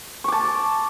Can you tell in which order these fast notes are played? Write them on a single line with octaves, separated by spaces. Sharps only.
C#6 D6 A5